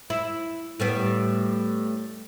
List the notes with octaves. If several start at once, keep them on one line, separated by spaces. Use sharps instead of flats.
E4
A2 G3 B3